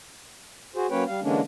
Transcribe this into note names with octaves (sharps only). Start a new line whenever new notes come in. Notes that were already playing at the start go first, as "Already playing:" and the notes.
F#4 G#4 C5
F#3 A#3 C#4 B4 C#5 G5
G3 F5
D3 E3 G#3 A#3 C#4 D4